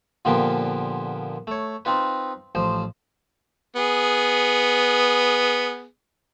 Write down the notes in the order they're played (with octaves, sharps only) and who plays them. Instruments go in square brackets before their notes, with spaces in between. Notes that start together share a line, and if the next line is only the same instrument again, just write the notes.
[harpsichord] A#2 D3 F3 A#3 B3 G4
A3 C#5
C4 D#4 F4 B4
A1 F3 C5
[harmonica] B3 G#4